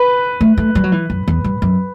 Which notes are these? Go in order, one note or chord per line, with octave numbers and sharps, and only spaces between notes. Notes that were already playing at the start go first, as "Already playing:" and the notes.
Already playing: B4
A3
A3
G3
F#3
E3
F#2
E2
G2
F#2